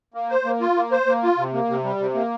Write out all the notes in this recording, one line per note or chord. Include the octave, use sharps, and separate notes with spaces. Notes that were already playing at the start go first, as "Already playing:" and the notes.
A#3
C5
A#3
F4
A#3
C5
A#3
F4
C3
A#3
C3
G3
C3
A#3